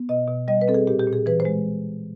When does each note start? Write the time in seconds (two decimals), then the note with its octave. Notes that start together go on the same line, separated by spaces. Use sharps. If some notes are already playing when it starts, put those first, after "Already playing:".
Already playing: B3
0.09 B2 D#5
0.28 B2
0.48 G3 D#5
0.61 B4
0.68 C4 A4
0.74 G#4
0.87 A#2 G4
1.00 G4
1.07 A#2
1.13 G#4
1.26 E3 B4
1.40 C5
1.45 G#3